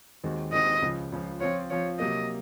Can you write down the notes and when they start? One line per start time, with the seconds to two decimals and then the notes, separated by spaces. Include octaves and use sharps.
0.24 D#2 D#3 G#3 C4 F#4
0.52 D#2 D#3 G#3 C4 F#4 D#5
0.82 C#2 C#3 F3
1.12 C#2 C#3 F3
1.40 F3 C4 F4 C#5
1.70 F3 C4 F4 C#5
1.99 C3 F#3 A#3 D#5